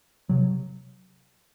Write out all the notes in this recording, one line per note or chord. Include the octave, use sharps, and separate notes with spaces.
C3 F#3